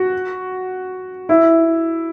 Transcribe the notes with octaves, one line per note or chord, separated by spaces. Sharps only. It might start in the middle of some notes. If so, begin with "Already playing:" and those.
Already playing: F#4
E4